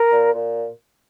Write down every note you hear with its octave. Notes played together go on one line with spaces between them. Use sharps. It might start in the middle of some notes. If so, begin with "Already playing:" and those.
Already playing: A#4
A#2
A#2